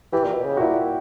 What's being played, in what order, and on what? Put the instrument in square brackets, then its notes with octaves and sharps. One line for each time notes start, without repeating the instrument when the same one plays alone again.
[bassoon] E3 [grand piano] G4
[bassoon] A#2
B2
C#3
[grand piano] F#4
[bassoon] A#2 [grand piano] E4